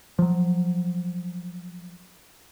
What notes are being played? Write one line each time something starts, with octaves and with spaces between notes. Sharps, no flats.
F3 F#3